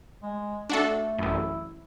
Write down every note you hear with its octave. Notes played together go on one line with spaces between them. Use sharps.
G#3
A3 D4 F#4 A4
A1 F#2 E4